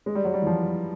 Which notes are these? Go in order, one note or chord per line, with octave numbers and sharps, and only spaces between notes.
G#3
G3
F#3
G3
E3
F3